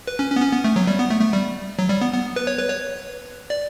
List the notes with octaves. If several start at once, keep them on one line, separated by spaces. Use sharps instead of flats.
B4
C#4
C#4
B3
C#4
B3
A3
F#3
G3
B3
A3
A3
G3
F#3
G3
B3
B3
B4
C#5
B4
C#5
D5